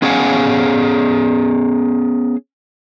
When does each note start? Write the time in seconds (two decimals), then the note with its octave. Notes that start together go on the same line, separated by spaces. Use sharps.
0.02 B3 C#4 G#4 F5 F#5 G#5